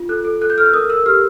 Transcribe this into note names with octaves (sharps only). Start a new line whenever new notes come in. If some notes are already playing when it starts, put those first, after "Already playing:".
Already playing: F4
A4 F#6
A4
A4 F#6
G6
A4 F6
E6
A#4 D#6
A#4 E6
G4 F6